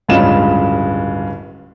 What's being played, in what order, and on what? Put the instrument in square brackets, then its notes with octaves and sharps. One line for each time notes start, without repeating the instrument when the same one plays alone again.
[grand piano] D1 G2 C#3 G#3 F4 E7